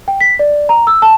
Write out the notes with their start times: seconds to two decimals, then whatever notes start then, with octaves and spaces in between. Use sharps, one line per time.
0.08 G5
0.21 B6
0.39 D5
0.69 A#5
0.87 E6
1.02 A5